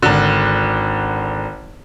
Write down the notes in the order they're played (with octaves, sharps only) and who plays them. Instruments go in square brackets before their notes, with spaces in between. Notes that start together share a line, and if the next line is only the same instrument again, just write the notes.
[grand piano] G#1 D3